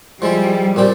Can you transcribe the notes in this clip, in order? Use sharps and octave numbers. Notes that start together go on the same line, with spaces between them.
F3 G3 G#3 E4
A#2 G3 C4 G4